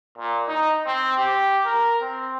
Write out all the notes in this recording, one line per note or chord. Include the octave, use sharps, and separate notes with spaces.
A#2
D#4
C4
G4
A#4
C4